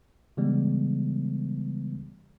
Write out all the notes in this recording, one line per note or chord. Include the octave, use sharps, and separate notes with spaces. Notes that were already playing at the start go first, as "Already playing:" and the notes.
C#3 E3 G3 G#3 B3